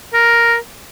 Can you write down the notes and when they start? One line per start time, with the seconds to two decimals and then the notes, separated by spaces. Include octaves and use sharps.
0.14 A#4